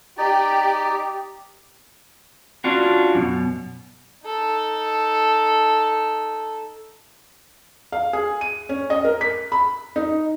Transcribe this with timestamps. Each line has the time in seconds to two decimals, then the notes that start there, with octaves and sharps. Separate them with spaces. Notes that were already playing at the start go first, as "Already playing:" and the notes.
0.18 D#4 G4 D5
2.64 C#4 D4 F4 F#4
3.15 F#2 B2
4.24 D#4 A4
7.92 F5
8.13 G#4
8.41 D#7
8.69 C#4
8.90 D#5
9.05 A#4
9.21 B6
9.52 B5
9.96 D#4